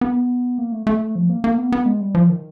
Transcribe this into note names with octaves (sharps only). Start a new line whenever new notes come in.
B3
A#3
A3
A3
F3
A#3
A#3
B3
B3
G#3
G3
F3
D#3